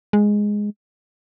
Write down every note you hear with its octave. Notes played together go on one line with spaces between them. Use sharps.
G#3